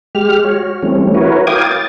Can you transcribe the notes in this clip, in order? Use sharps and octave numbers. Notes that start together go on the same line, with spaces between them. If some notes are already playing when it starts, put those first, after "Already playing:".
G#3 G4 F6
F#4 C#5
E3 G3 A3 C4 C#4
E4 F#4 A#4 B4 C#5
F5 G5 D6 D#6 G#6
A6